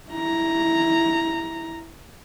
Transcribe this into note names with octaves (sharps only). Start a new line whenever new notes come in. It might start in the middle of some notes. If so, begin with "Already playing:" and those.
E4 A#5